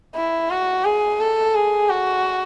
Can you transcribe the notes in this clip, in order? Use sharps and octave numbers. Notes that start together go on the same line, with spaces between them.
E4
F#4
G#4
A4
G#4
F#4